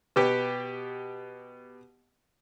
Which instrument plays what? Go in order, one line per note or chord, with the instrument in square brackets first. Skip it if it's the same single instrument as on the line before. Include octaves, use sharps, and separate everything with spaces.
[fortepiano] B2 B3 G4